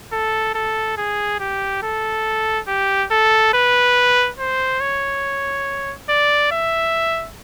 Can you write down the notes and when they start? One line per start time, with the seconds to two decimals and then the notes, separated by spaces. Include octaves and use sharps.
0.13 A4
0.55 A4
0.98 G#4
1.40 G4
1.83 A4
2.68 G4
3.11 A4
3.54 B4
4.39 C5
4.81 C#5
6.09 D5
6.52 E5